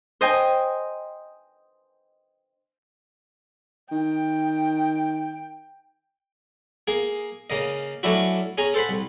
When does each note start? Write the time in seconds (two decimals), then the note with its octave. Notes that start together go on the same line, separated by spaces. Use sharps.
0.21 C5 D#5 G5 G#5
3.92 D#3 G5
6.88 A#3 G#4
7.50 C#3 A#3 D#5
8.03 F#3 A3 C#4 D4 E4 F#4
8.58 C#4 G#4 G#5 A#5
8.74 A4 C5 F#5 B5
8.89 C2